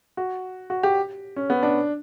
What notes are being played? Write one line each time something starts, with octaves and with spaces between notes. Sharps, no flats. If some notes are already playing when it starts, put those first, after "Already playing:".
F#4
F#4
G4
C#4
B3
D4